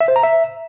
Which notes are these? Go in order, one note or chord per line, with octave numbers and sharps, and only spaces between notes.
E5
C5
A#5
E5